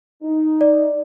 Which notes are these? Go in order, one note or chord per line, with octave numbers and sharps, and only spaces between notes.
D#4
D5